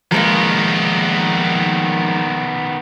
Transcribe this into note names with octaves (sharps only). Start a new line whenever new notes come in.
D#3 F3 G#3 A#3 B3